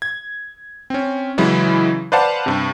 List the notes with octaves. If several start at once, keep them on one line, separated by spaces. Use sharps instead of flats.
G#6
C4 C#4
C#3 E3 F#3 G#3 E4
B4 C5 D5 F5 F#5 A5
G2 C3